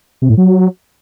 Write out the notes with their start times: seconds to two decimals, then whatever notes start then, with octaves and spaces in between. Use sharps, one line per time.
0.22 C3
0.30 A2
0.37 F#3